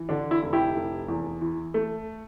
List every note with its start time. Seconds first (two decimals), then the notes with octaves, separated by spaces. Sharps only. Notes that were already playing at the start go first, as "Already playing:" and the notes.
Already playing: E3
0.09 D3 D4
0.31 E4
0.42 F1
0.53 E4 G4
0.76 F1
1.08 E2
1.41 E3
1.74 A3